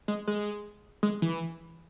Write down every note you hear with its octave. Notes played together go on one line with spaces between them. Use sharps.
G#3
G#3
G#3
E3